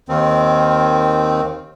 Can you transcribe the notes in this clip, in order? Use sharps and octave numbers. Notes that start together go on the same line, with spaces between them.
D#2 D#3 C4